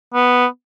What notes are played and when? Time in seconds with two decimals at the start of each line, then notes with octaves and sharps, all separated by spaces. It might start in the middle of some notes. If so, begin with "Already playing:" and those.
0.14 B3